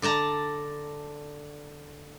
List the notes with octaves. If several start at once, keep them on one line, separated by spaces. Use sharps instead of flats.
D3 D5 A5 A#5